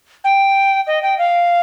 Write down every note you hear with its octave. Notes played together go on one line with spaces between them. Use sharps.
G5
D#5
G5
F5